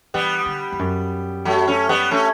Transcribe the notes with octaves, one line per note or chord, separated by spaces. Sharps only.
E3 G3 B3
D3
E2
F#2
F#3 A3
A3 C#4
G3 B3
A3 C#4